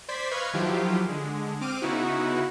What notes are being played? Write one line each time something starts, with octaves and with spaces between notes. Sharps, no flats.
C5 D5 C6 G#6 B6
B4 D#5 F5 B5 C#6 G#6
D#3 F3 F#3 E4 F4 G4
D3 G#3
C4 D6 F6 D#7
C#3 B3 D#4 E4 F#4